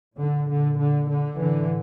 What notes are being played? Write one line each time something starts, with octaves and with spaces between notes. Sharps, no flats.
A#2 D3
D3
D3
D3
A2 D3 E3